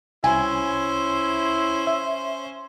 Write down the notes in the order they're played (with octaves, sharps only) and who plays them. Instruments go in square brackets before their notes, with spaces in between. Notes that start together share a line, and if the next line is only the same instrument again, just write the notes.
[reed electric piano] C2 [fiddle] C#4 C5 [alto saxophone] E4 [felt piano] G#5
[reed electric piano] E5